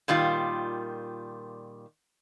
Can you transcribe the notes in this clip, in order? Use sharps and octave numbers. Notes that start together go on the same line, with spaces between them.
A#2 D#3 G3 F4